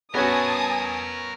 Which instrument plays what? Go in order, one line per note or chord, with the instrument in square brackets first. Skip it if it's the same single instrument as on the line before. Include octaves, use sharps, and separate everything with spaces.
[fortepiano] B3 C#4 F#4 [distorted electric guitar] A#4 E5 [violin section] G#5 A5 D#6